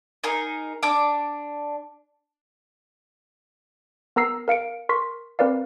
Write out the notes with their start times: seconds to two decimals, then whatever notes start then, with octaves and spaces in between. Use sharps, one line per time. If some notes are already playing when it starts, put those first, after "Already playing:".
0.24 D#4 G#4 A#4
0.83 D4 D6
4.16 B3 A#4 A#5 E6 C7
4.48 A#4 F5 C#7 D7
4.89 A#4 C6 C#6 B6
5.39 C4 A#4 B4 D5 F5